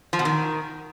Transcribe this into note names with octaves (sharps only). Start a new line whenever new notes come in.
F3
B2
D#3